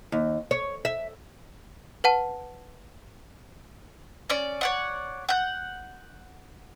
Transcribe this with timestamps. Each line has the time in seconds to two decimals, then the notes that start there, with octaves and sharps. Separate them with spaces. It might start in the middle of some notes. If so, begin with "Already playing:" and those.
0.12 D#2
0.51 C#5
0.85 E5
2.04 B4 F#5 A5
4.30 C#4 D5
4.61 C#5 D5 F#5
5.29 F#5 G6